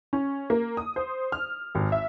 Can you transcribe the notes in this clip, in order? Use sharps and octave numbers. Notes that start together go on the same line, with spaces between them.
C#4
A#3
D#6
C5
F6
G#1
E5